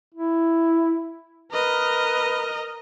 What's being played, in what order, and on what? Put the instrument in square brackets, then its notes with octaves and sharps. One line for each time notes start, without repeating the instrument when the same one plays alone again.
[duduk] E4
[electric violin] A#4 D#5 [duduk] B4